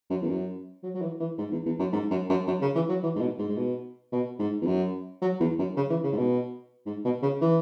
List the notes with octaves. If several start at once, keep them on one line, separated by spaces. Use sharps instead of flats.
F#2
E2
F#2
F#3
F#3
E3
E3
G#2
E2
E2
F#2
G#2
F#2
F#2
F#2
C#3
E3
F#3
E3
G#2
B2
G#2
G#2
B2
B2
G#2
E2
F#2
F#3
E2
F#2
C#3
E3
C#3
G#2
B2
G#2
B2
C#3
E3